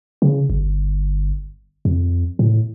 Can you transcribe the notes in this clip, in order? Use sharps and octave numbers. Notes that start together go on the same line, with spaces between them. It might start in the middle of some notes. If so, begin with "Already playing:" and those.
C#3
G1
F2
A2